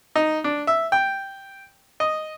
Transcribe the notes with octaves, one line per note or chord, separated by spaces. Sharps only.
D#4
D4
E5
G5
D#5